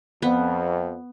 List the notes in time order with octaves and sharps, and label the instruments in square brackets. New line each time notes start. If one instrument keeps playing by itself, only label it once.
[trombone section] F2 [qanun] B3